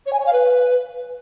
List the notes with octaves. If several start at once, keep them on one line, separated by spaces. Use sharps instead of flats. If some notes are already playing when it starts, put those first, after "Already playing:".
C#5
G#5
C#5
F5
B4